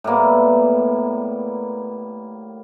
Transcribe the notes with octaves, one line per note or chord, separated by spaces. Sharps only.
A2 G3 A#3 B3